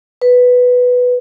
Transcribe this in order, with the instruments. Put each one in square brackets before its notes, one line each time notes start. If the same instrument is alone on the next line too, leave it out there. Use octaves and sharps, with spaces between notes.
[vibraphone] B4